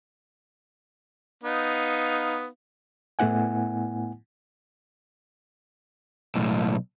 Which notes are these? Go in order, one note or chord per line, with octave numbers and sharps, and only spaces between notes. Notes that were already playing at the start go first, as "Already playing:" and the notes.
B3 D#4 F5
A2 A3 B3 E4 F#5 G#5
B1 A2